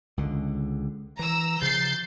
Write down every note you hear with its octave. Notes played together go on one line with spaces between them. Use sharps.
C#2 D3
E3 A#5 E6
C#3 F3 G6 A6 C7